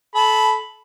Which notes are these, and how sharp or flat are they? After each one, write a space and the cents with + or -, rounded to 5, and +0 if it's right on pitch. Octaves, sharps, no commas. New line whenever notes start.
A4 -25 B5 +0